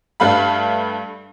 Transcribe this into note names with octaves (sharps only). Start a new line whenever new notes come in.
G2 G3 A3 F5 B5